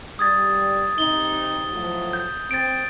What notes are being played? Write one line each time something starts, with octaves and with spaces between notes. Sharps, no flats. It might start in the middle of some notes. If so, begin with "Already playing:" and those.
G3 D#6 G#6 A6
C3 D#4 G7
A2 F3 F#3
G6
C4 A6 D7